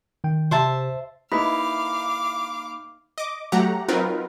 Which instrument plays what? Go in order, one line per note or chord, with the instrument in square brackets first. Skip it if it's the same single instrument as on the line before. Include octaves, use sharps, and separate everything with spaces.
[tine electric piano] D#3 G5
[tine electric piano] C3 G4 [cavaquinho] C5 E5 A5
[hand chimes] A#3 B5 [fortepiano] D#4 [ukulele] E4 B4 [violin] F5 D6
[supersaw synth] D#5 D6
F#3 A3 G4 F#5 A#5
F#3 C4 D#4 F4 A#4 B4